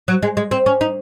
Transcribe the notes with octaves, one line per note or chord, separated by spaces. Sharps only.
F#3
G#3
G#3
C4
C#4
D#4